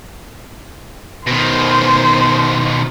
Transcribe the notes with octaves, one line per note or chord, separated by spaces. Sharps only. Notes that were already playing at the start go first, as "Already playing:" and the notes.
B2 D#3 C5